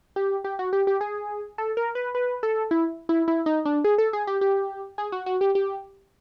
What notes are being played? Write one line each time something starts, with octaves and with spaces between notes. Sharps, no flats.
G4
G4
F#4
G4
G4
G#4
A4
A#4
B4
B4
A4
E4
E4
E4
D#4
D4
G#4
A4
G#4
G4
G4
G#4
F#4
F#4
G4
G4